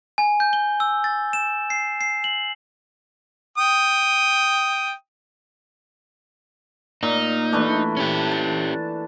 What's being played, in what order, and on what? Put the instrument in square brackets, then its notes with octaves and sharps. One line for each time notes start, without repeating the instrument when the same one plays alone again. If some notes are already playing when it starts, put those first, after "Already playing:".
[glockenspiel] G#5
G6
G7
E6
A6
E7
C7
C7
F#7
[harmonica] G5 D#6
[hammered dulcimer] A#2 [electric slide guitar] D#4
[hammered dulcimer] E3 A3 D4
[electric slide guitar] C#4 G4
[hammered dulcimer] A5